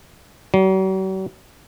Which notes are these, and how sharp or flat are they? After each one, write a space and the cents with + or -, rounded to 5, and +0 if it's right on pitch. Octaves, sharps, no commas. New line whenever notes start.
F#3 +45